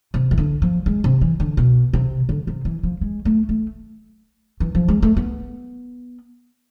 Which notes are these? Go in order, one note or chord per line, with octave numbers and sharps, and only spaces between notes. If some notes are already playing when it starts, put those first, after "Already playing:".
C3
E3
D3
F3
G#3
C3
E3
D3
B2
C3
D3
C3
E3
F3
G#3
A3
A3
E3
F3
G#3
A3
B3